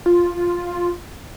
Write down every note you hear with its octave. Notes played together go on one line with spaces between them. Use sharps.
F4